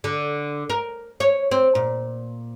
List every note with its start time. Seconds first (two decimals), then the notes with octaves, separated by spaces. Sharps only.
0.04 D3
0.70 A#4
1.20 C#5
1.51 C4
1.75 A#2